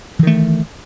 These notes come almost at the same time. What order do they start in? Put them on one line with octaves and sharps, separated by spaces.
E3 D#3 A3